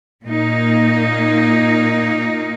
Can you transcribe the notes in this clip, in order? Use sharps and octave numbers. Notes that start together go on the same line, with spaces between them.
A#2 A#3 D#4